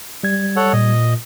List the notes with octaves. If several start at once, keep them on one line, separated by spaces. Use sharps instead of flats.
G3 G#6
A4 C#5 F#5
A#2 D#5